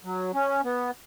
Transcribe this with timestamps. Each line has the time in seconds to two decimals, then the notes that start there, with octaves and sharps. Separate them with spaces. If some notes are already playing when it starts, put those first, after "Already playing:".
0.04 F#3
0.34 C#4
0.64 B3